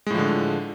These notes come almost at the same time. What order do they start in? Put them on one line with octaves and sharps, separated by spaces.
G#3 A2 F3 D3